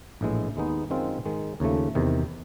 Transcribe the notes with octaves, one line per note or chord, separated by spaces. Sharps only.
A#1 A2 E3 G#3
D#2 D#3 G#3 B3 D#4
F#2 D#3 G#3 C4 F4
G#2 D#3 G#3
D#2 C#3 F3 A3
E2 C3 D#3